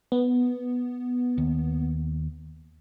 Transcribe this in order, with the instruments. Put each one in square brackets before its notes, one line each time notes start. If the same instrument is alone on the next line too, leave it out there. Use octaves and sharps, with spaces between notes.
[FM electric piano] B3
[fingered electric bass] D#2